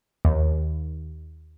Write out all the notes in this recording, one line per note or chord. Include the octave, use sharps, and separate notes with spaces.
D#2